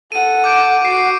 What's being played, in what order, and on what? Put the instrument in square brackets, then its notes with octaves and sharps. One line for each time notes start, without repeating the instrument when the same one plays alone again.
[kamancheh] A4 F#5 [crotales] D#7
[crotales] D6 G6 D7
[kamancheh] F#4 [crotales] C7 D7